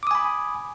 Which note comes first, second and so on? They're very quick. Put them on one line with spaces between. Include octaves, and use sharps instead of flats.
D6 D#6 G#5 B5